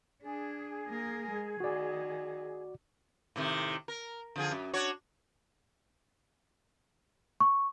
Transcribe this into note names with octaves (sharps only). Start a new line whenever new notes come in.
D4 G#4
A#3 A#4
G#3
D#3 F#4 D5
A2 C3 D#3
A#4
D3 F3 G#4
F#2
D4 F#4 C#5
C#6